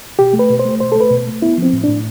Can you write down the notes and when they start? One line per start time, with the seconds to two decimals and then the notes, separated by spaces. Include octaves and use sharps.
0.19 B2 G4
0.33 A3
0.39 B4
0.50 B2
0.59 C5
0.65 A3
0.80 B2 C5
0.92 A3 A4
1.00 B4
1.11 B2
1.27 A3
1.42 B3 E4
1.58 F3 C4
1.73 A2
1.84 A2 D4